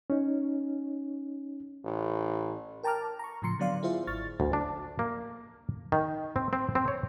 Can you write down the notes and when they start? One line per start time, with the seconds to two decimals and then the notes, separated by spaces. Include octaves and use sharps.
0.10 C#4 D#4
1.84 A1
2.83 A#4 G5 A5 A#5 D6 F6
3.19 A#5 C#6
3.42 A2 C#3 F3 A#5 C6 C#7
3.59 D3 F#3 B3 D5 F5 C6
3.83 E4 F4 G#4 C5 E5 F5
4.07 G#1 E4 C#6 F6 A6
4.40 D2
4.53 D4
4.99 A#3
5.92 D#3
6.36 C4
6.53 C4
6.75 C4
6.88 C#5